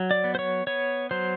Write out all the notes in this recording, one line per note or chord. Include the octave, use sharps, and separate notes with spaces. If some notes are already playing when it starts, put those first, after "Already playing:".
Already playing: F#3
D5
B3
C5
C#5
B3 C#5
F#3 C5